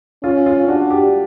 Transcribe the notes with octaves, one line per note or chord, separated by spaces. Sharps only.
C#4 F4
F4
D4 F#4
G4